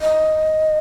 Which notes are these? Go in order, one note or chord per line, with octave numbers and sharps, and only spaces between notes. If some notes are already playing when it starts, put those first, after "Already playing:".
D#5